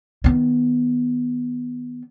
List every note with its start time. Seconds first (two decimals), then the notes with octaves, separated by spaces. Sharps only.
0.24 D#3 B3